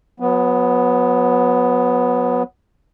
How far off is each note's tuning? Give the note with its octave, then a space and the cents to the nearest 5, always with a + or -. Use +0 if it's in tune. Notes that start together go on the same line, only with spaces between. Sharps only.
F#3 -30 B3 +0